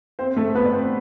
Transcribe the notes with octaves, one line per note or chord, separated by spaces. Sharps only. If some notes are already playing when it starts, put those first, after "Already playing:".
C4 C5
A3 A4
B3 B4
D5
C4 C5